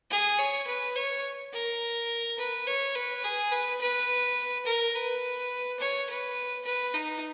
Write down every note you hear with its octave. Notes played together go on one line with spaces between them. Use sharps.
G#4
C#5
B4
C#5
A#4
B4
C#5
B4
G#4
B4
B4
A#4
B4
C#5
B4
B4
D#4